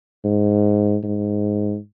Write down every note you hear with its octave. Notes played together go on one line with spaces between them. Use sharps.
G#2
G#2